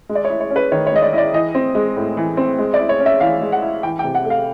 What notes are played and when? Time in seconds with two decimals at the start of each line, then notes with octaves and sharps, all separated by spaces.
0.09 G#3
0.15 D5
0.25 C#5
0.30 E4
0.40 C#5
0.50 C#4
0.56 B4
0.72 D#3 C#5
0.86 C#5
0.92 G#3 D#5
1.02 D5
1.13 E4 D5
1.34 E3 D#5
1.55 C4
1.75 G#3
1.97 A2
2.17 E3
2.37 C4
2.59 G#3
2.74 D5
2.79 E4
2.89 C#5
3.00 C#4
3.06 E5
3.20 E3 F5
3.41 G#3
3.52 F#5
3.62 E4
3.83 E3 G5
3.99 G5
4.04 C3
4.15 F#5
4.25 A3
4.30 F5